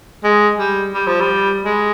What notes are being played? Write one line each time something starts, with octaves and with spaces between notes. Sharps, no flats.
G#3
G3
G3
F3
G3
G#3